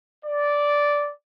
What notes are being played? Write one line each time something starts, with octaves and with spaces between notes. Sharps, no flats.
D5